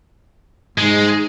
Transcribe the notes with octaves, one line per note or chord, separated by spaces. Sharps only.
G#2 G#3